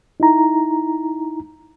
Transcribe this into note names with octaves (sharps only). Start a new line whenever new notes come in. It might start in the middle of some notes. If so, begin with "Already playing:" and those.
D#4 E4 A#5